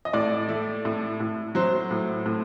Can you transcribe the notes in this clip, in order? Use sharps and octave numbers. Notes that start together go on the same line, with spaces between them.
D#5
A2 D5
A3
A2
A2
F#3 C5
A2
A2